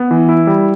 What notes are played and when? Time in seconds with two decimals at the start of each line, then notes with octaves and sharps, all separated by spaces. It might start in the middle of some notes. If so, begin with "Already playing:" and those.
Already playing: B3
0.11 E3
0.29 E4
0.47 G3